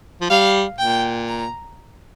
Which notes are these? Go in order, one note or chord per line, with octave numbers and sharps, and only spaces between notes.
F3
G3 F5
A#2 G5
A#5